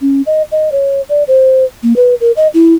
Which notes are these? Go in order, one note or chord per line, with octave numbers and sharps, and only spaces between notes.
C#4
D#5
D#5
C#5
D5
C5
A#3
B4
A#4
D#5
E4